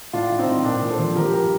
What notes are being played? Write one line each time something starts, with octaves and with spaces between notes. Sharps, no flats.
A2 D4 F4
A2
C4 D#4
A2
A#2 D4
A#2
A4 C5
F3
F3 G4 A#4
G2 G4 A#4